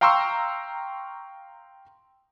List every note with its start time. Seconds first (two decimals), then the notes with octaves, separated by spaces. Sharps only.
0.01 F5 G5 A#5 C6 C#6 E6